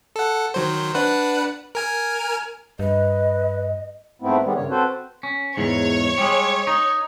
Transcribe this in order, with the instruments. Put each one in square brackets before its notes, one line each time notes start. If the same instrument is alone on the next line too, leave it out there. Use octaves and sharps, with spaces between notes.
[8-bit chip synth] A4 F#5
D#3 F#3 C5
D4 B4 F#5
A#4 G#5 F6
[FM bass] G2 [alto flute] B4 [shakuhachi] D#5
[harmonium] G#2 A3 B3 C4 E4
D#3 G3 G#3 B3
G2 C#3 C#5
C4 F#4 A4 B4 C5
[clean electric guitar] C#4
[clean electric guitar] E2 G#2 [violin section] C#5
[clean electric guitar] G3 G#3
D#4